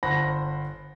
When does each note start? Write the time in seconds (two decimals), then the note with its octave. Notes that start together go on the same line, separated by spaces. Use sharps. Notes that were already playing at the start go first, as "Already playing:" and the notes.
0.03 G1 C5 F#5 B5 A#6